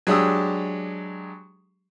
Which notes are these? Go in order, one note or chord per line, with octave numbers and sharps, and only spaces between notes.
F#3 G#3 D4 G4 D#6 E6